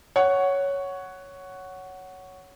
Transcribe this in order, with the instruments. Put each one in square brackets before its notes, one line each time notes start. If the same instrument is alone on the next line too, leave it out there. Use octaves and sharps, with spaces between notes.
[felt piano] C#5 F#5